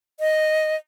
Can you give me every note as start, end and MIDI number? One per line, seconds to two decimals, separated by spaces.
0.20 0.76 75